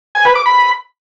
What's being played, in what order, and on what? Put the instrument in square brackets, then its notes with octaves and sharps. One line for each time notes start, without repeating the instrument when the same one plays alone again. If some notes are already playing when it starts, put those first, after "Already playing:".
[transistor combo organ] G#5
B4
D6
B5